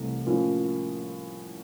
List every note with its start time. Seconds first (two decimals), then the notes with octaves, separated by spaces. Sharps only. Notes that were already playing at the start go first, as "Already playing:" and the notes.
Already playing: C2 C3 E3 A3
0.26 A2 F3 A#3 C#4 F4